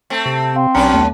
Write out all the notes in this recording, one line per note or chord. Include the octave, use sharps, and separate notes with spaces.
A3 C4
C3
C4 F5
B1 F#3 C#4 D4 B4 A#5
D#2 A3 B3